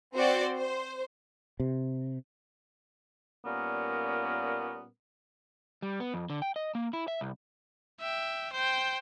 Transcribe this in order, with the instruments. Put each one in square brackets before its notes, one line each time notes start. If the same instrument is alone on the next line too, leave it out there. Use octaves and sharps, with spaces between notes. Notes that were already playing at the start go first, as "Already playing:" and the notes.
[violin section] C4 F#4 C5 D5
C5
[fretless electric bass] C3
[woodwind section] A#2 G3 A#3 B3 C#4 A#4
[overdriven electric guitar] G3
B3
F2
D3
G5
D#5
A#3
E4
E5
C2
[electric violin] E5 G5
C5 G5